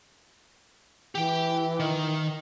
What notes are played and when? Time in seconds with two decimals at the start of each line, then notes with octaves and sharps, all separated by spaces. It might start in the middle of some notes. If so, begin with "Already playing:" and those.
1.15 E3 G4 G5
1.80 D#3